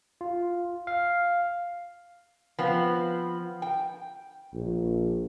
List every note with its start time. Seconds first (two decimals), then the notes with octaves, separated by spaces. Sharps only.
0.21 F4
0.87 F5
2.59 F3 B3 C4
3.62 G5
4.54 A#1